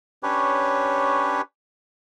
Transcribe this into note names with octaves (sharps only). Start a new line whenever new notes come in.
C#4 D4 G4 B4 C#5